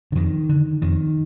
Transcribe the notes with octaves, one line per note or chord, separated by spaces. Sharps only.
D3
F2 D#3
D3
F2 D#3